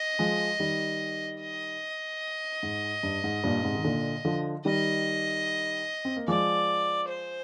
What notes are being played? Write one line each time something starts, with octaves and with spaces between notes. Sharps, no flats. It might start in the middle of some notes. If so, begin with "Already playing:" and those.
Already playing: D#5
F3 G#3
D#3 G3
D#5
G#2
G2
G#2
G2 A#2
G#2 C3
D#3
A#2 D3
D3 F3
D#3 G3 D#5
C4
A#3
F3 G#3 D5
C5